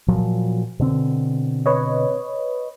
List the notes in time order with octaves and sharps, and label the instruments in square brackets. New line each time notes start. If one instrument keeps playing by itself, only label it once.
[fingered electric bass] A#2 F3 F#3
B2 D3 C4
[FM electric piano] B4 C#5 D#5